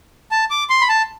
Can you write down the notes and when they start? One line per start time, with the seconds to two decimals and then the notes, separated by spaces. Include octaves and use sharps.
0.31 A5
0.50 D6
0.70 C6
0.81 B5
0.89 A5